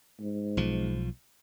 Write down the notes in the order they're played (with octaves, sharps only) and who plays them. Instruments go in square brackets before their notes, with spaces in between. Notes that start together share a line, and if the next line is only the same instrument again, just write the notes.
[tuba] G#2
[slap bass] B1 F3